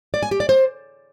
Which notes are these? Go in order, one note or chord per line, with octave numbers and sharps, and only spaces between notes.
D5
G#5
G4
D5
C5